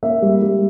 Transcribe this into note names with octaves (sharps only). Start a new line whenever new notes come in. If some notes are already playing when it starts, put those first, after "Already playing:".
A#3 E5
G3
G3